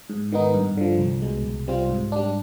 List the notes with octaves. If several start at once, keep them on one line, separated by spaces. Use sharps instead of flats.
G#2
D#3 B3 D#4
G2
D3 F3
C2
B2 G#3
C2
C3 G3 C4 F4
G#2
G3 D4